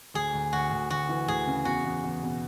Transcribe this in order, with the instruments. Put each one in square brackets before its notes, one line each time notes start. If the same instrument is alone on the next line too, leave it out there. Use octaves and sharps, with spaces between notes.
[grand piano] D2 [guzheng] G#4
[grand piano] D2
[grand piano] D2 [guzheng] F#4
[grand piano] D2
[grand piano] D2 [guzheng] F#4
[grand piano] E3
[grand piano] D2 [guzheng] G#4
[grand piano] C#3
[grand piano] E2 [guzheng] F#4
[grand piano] E2
E2
B2